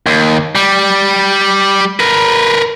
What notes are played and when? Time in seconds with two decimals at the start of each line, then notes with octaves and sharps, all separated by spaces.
0.06 D#2
0.55 G3
2.00 A#4 B4